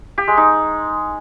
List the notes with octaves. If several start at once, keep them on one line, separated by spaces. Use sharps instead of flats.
G4
G#3
D#4